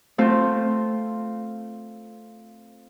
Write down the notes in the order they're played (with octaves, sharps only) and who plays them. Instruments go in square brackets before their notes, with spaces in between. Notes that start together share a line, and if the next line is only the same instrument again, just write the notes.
[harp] A3 C4 F4